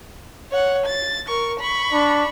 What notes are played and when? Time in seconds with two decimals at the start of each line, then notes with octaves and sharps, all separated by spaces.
0.51 C#5 F#5
0.86 A6
1.28 A#4 C#6
1.59 B5 C#6
1.93 D4